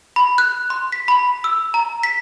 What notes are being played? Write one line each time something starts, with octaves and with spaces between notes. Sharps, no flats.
B5
F#6
C6
B6
B5
E6
A#5
B6